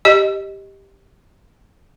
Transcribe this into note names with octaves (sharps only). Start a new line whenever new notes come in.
G4 D#5